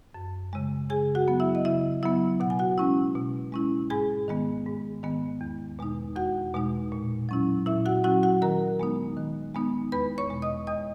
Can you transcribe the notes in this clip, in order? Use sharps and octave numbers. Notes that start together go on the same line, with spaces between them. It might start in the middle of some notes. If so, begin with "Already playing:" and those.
F#2
C#3 G#3
C#3 G#4 G#5
F#4 F#5
F#3 B3
E4 E5
D#5
C#3 E4 E5
F#3 B3 E4 E5
B2 F#5
G#5
F#4 F#5
G#3 C#4 E4
B2
G#3 C#4 E4
G#2 G#4 G#5
D#3 G#3 B3
G#2
D#3 G#3 B3
E2
B2 G#3 D#4
E2 F#4 F#5
B2 G#3 D#4
A#2
F#3 C#4 E4
A#2 E4 E5
F#4 F#5
F#3 C#4 E4 F#4 F#5
F#4 F#5
D#3 A#4 A#5
G#3 B3 D#4
D#3
G#3 B3 D#4
E2 B4 B5
C#5 C#6
B2 G#3
D#5 D#6
E2 D#5 D#6